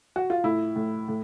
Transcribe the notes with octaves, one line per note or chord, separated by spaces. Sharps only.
F#4
F4
A2 E4
A2
A2